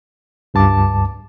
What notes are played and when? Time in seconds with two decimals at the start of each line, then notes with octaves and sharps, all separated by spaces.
0.54 C#2 G2 A5 D6